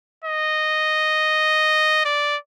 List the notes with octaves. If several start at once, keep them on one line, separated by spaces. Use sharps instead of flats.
D#5
D5